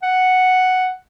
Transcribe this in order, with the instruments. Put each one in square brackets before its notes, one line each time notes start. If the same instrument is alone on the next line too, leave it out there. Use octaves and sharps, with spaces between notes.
[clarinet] F#5